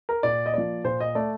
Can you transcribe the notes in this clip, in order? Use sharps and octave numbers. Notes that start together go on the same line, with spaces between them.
A#4
A#2 D5
D#5
F3 A#3 D5
A#2 C5
D#5
A3 D5